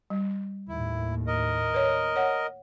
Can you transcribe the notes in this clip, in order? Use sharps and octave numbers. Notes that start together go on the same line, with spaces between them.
G3
D#2 A2 E4
A#4 D#5
B4 C#5
C#5 F#5